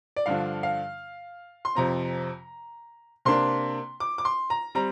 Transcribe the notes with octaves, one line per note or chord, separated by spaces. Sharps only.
D5
G2 D3 F3 D4 F5
F5
C6
F2 C3 F3 C4 A#5
C3 A#3 D4 C6
D6
D6
C6
A#5
G3 C4 A#5